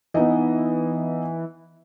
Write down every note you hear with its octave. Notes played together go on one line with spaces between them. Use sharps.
E3 B3 D#4 D#5